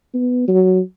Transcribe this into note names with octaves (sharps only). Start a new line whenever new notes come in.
B3
F#3